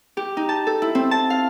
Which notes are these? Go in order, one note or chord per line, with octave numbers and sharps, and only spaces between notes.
G4
D#4
A5
A4
E4
C4
A5
F5